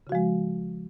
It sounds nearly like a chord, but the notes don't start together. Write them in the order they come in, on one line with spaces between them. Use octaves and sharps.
C#3 F#4 F3 G#3